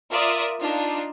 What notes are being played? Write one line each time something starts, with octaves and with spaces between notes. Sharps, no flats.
F4 A#4 D5 E5 D#6
D4 D#4 F4